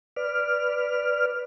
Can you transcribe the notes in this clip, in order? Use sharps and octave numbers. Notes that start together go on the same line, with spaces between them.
B4 D5 F6